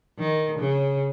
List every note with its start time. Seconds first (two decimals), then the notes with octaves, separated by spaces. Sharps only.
0.19 D#3
0.60 C#3